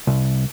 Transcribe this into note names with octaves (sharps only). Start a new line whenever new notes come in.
C2